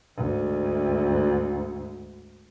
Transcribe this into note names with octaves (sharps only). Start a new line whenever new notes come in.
D2 G#2